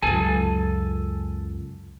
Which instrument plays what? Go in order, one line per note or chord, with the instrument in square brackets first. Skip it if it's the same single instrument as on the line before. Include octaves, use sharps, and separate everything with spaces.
[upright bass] C#2 F#2 [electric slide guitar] A4 G#5 A5